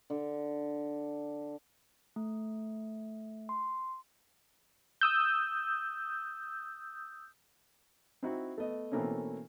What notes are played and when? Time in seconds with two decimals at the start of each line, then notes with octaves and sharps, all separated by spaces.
0.10 D3
2.16 A3
3.49 C6
5.01 D#6 E6 G6
8.23 C4 D#4 E4 F#4
8.58 A3 B3 D#5
8.92 B2 E3 A3 A#3 C4 C#4